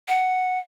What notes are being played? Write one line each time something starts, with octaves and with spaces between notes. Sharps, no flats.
F#5